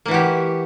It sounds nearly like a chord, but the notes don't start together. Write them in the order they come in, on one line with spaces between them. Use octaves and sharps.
A#3 E3 F#4 G4